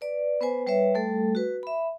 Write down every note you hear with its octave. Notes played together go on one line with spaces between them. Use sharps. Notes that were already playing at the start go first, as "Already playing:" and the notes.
B4 D5
B3 B4 C5 G#5
G3 B4 C#5 E5
G3 A3 A4
F#4 B4
E5 B5